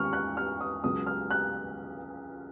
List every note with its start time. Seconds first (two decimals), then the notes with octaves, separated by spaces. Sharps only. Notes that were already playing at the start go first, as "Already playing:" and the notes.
Already playing: D#2 D#3 G#3 C#4 C#6 F6
0.13 F#6
0.37 F6
0.61 D#6
0.83 C#2 C#3 F#3 D#6
1.07 F6
1.31 F#6